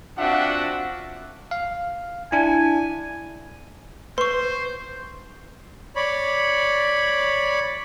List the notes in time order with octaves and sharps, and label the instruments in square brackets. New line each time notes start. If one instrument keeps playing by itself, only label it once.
[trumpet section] C4 D4 F4 F#4 E5 F#5
[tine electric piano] F5
[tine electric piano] D4 E4 [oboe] G#5
[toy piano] B4 [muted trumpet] C5 [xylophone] C6 C#6
[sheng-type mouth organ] C#5 D5 B5